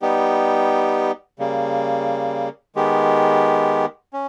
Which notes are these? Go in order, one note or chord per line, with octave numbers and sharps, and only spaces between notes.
G3 B3 D#4 G4
C#3 G3 A#3
D#3 G#3 B3 G4
C#4